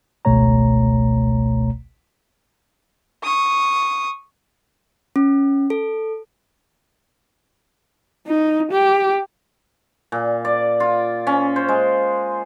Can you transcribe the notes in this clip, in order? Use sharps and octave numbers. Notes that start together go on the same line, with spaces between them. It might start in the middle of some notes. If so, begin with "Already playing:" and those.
G#1 C#2 B2 A3 C#5 A#5
C#6 D#6
C#4
A4
D#4
G4
A#2
D5
F4
C#4
C5
G#3